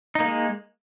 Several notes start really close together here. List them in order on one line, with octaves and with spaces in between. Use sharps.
D#4 A#3 G#3